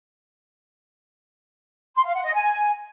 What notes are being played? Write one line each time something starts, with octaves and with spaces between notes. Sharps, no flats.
C6
F5
F#5
D#5
G#5